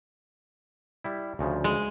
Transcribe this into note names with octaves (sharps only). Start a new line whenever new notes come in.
G3 E4
D2 C#3 F3
G#3